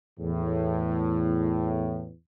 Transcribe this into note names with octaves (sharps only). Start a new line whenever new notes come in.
E2 A2